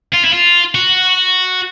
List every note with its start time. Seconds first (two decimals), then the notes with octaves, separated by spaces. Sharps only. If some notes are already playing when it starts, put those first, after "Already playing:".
0.14 F4
0.25 E4
0.33 F4
0.75 F#4